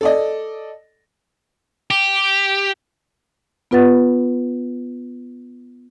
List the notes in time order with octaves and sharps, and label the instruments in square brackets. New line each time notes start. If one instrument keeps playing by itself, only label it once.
[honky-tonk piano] A4 D5 D#5
[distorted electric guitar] G4
[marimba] B3 F4 B4 F#5 A6